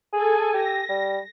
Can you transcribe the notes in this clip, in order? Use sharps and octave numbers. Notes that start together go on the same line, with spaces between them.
G#4 A4 G#5
G4 A#6
G3